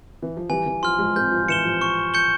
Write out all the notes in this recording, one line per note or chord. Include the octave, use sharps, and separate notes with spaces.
E3
F3
E3 G3 G#5
E3
F3 C6 F6
F3 G#3
G#3 C4 G6
F3
F3
E3 C#7 E7 G7
F3
C#6
G6 C#7 G7